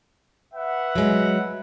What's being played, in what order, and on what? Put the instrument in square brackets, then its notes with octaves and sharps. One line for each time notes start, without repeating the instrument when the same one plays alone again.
[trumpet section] B4 E5 F#5
[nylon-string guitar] F#3 G#3